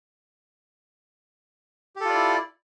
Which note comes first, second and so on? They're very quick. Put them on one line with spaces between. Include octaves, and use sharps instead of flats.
G4 A4 F4 D5 E4